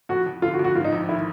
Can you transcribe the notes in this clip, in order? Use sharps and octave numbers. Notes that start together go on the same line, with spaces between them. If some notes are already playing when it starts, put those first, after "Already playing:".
F2 F#4
F2
D3 F4
F#4
F2
F#4
G#2 F4
D#4
A#1
D#3 E4